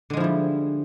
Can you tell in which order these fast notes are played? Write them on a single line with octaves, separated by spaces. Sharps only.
D3 G#3 F3 E4 G3